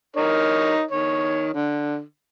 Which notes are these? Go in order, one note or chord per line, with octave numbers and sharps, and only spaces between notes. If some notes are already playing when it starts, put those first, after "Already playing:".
D#4 A#4 C#5
D#3 C#5
D3